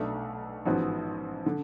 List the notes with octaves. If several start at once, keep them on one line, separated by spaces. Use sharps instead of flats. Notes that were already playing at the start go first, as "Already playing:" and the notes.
Already playing: B1 B2 A3 D4
A1 G#2 F3 B3 F#4
D3